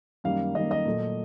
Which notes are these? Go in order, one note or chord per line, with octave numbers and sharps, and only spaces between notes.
F#2 D#3 G3 A#3 F5
F#2 D#3 G3 A#3 D#5
D#5
A#2 F#3 A3